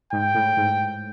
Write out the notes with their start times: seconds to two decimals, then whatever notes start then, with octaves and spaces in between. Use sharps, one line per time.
0.13 G#2 G5
0.34 A2
0.57 G#2